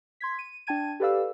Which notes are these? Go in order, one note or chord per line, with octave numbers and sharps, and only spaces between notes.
C6 G#6 B6
D#7
D4 G5 A5 G#6 D#7
G4 A4 B4 D5 F5 E6